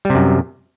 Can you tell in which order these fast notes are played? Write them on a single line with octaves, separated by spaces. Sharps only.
G3 C3 F#2